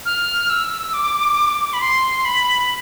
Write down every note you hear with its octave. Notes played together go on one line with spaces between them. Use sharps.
F6
E6
D6
B5
C6
B5